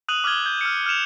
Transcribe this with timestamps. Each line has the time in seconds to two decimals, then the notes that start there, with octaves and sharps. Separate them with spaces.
0.08 D#6 F#6 D#7 F7 F#7
0.24 D6 F6 F#6 G#6 G7
0.46 G6
0.61 F6 C#7
0.86 F6 G6 C#7 E7 F7